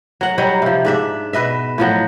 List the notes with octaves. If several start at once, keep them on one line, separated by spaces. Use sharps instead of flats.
F#3 F#5
F#3 G3 D#4
C3 F3
G#2 D4 E5
B2 B4 D#5 E5
A2 F3 F#3